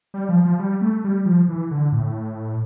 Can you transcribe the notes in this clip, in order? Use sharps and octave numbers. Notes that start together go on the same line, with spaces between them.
G3
F3
F3
G3
A3
G3
F3
E3
D3
A2